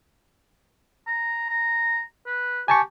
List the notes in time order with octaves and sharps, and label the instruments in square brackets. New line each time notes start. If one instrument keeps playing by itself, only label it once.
[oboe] A#5
A#5
B4
[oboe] G4 [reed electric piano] G#5 A5 C#6